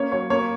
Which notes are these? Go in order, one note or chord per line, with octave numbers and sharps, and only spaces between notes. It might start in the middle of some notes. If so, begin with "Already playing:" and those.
Already playing: A#3 C#4 C#5
F#3 C#5
A#3 C#5